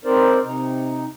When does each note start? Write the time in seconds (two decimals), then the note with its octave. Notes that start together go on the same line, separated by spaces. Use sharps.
0.05 C4 D#4 A#4 C5 D5
0.43 C3 D#4